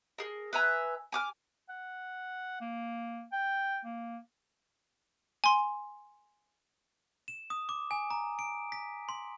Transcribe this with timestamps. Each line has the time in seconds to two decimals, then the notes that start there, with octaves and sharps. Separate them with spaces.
0.18 G#4 A#4
0.53 B4 E5 G#5 A#5
1.12 G#5 D6 F6
1.69 F#5
2.61 A#3
3.32 G5
3.85 A#3
5.44 G#5 C6
7.28 E7
7.50 D#6
7.69 D6
7.91 G#5
8.11 A#5
8.39 D7
8.72 B6
9.09 C6